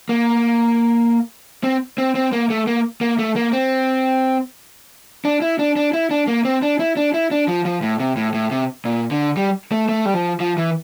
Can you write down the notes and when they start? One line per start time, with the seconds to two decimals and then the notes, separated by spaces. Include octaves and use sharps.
0.09 A#3
1.64 C4
1.98 C4
2.15 C4
2.33 A#3
2.50 A3
2.67 A#3
3.01 A#3
3.19 A3
3.36 A#3
3.53 C4
5.25 D4
5.42 E4
5.59 D4
5.76 D4
5.93 E4
6.11 D4
6.28 A#3
6.45 C4
6.62 D4
6.80 E4
6.97 D4
7.14 E4
7.31 D4
7.48 F3
7.65 F3
7.83 A2
8.00 C3
8.17 A2
8.34 A2
8.51 C3
8.85 A#2
9.11 D3
9.37 G3
9.72 A3
9.89 A3
10.06 G3
10.14 F3
10.40 F3
10.58 E3